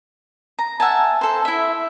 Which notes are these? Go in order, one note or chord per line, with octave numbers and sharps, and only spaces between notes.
A#5
E5 F#5 G#5 A5
A4 C5
E4 E5